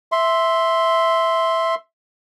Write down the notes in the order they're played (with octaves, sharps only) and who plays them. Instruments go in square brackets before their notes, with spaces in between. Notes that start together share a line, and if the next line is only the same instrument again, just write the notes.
[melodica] E5 C6